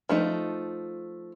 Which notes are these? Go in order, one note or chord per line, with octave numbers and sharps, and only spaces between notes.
F3 A3 D#4